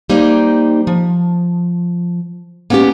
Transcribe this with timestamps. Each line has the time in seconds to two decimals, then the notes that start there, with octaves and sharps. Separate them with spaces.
0.10 G3 A#3 D#4 C5 D#5
0.87 F3
2.70 A#3 B3 C#4 D4 G4